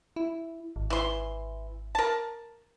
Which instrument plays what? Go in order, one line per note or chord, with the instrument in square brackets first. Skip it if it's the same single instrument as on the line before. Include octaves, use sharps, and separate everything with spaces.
[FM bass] E4
G#1
[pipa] E3 C6
A#4 A5